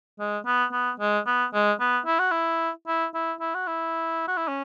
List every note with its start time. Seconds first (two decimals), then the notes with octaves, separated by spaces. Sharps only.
0.19 G#3
0.46 B3
0.72 B3
1.00 G#3
1.26 B3
1.53 G#3
1.80 B3
2.06 E4
2.19 F#4
2.31 E4
2.87 E4
3.14 E4
3.40 E4
3.54 F#4
3.67 E4
4.27 F#4
4.37 E4
4.48 C#4